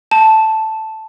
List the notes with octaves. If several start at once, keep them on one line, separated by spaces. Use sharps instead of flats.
A5